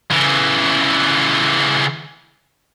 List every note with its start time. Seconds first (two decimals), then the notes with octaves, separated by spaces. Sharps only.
0.11 C#3 E3